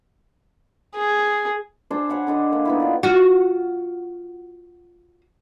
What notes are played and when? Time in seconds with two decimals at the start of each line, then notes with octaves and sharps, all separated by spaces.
0.96 G#4
1.90 D4 C5 G#5 A5
2.09 C#5 F#5 G#5 B5
2.27 D3 D4 D#5
2.51 A#3 D4
2.65 B3 D#4 E4
2.80 F4 D5
3.03 F4 F#4